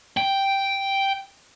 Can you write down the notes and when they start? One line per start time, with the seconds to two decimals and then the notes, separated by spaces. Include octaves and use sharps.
0.17 G5